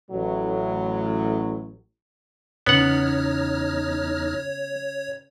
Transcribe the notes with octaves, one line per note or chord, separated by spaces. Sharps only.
A1 A2 F#3
E2 C#3 B3 D#4 C#5 F#5 F6